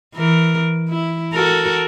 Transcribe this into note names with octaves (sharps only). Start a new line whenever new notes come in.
E3 A#4
E4
F#4 A4 A#4